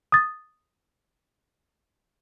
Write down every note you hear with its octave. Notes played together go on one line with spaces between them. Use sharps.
D#6 A6